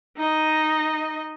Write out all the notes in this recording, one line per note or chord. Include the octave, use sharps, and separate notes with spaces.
D#4 D#5